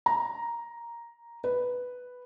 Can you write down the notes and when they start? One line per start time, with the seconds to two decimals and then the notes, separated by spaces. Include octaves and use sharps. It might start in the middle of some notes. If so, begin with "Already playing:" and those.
0.06 A#5
1.44 B4